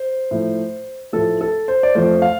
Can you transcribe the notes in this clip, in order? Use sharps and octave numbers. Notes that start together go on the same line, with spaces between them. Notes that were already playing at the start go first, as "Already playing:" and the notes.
Already playing: C5
A2 F3 A3
A2 F3 A3 A4
A4
C5
D5
F2 F3 A3 C5
F5